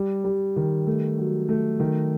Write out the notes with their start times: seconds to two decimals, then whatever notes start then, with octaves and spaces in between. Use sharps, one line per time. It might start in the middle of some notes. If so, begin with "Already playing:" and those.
Already playing: G3
0.24 G3
0.56 D#3
0.87 A3
1.18 F#3
1.49 A3
1.80 D#3